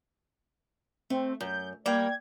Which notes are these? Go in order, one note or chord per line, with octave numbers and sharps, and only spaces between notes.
A3 C4
F#2 G6
G3 A#3 D5 G5 G#6